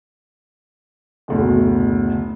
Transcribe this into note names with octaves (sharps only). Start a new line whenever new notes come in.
F#1 D2 B2